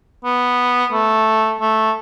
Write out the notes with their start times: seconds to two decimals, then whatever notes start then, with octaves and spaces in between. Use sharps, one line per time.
0.24 B3
0.92 A3
1.61 A3